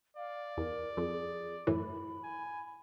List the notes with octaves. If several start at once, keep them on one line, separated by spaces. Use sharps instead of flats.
D5 F5
E2 A#4
F2 G#4
F#2 A2 E3 B5
G#5